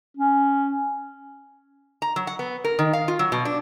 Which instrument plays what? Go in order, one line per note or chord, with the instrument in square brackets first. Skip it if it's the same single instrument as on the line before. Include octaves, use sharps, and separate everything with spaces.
[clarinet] C#4
[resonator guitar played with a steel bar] A#5
F#3
F#5
B3
A#4
D#3
F5
F4
F#3
B2
D4